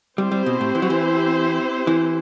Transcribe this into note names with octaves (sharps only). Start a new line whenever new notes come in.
G3 C4 E4 G4 C5
G3
B2
A2
E3
F#3
E3
E3